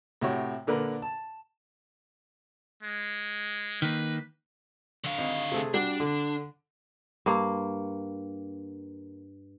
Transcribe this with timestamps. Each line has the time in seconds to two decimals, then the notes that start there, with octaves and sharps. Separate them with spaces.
0.21 A2 C3 F#4 C#5
0.67 A#2 D3 A#4 B4
1.02 A5
2.83 G#3
3.82 D#3 A#3 B4
5.04 D3 F5
5.18 G#1
5.52 C3 A3 G#4
5.74 G3 D4 F#4
6.00 D3
7.26 G2 A#3